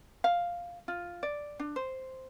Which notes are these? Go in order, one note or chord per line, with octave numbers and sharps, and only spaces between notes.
F5
F4
D5
D4
C5